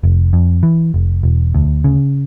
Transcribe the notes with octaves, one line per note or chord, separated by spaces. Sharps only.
F1
F2
E3
F1
E1
D2
C#3